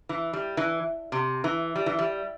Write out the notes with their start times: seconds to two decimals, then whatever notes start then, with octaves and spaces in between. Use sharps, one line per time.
0.09 E3
0.33 G3
0.57 E3
1.12 C3
1.44 E3
1.76 G3
1.86 E3
1.99 G3